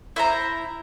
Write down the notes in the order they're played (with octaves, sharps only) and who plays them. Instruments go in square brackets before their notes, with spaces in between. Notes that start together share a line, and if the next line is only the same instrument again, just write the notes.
[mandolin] E4 C5 A#5